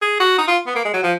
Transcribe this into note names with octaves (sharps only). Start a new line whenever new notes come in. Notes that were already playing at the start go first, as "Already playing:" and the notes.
G#4
F#4
D#4
F4
B3
A#3
G#3
F#3
F3